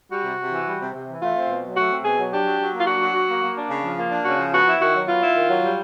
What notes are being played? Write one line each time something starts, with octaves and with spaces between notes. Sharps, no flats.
G3 F#4
C3
C3
E3
G3
C3
C3
E3
A3 F4
C4
B2
F#3
A3 F#4
C4
B2 G#4
F#3
D4 G4
F#3
F#3
A#3
F4
D4 F#4
F#3
F#3
A#3
A#3
D4
C#3
F3
A#3 F4
D4
C#3 F#4
F3
B3 F#4
E4
D#3 F#4
F#3
B3 F4
E4
D#3
F#3
G3